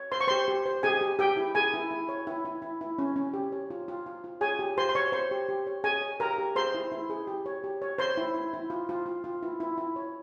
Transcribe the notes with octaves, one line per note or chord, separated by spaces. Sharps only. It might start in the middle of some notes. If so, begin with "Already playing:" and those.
Already playing: C#5
C5 C6
C#6
G4 C5 C6
G4
C5
G4 G#4 G#5
G4
G4 G5
E4
G#4 A#4 G#5
E4
E4
C#5
E4
E4
E4
E4
C#4
C#4
G4
C#5
F4
F4
F4
F4
G#4 C#5 G#5
G4
G4 C5 C6
C6
C#5 C#6
C5 C#5 C6
G4
G4
C#5
G#4 C#5 G#5
C#5
G4 A#4 A#5
G4
G#4 C5 C6
E4
E4
G#4
G4
C#5
G4
C#5
C5 C#5 C6
E4
E4
E4
F4
F4
F4
F4
E4
E4
E4
C#5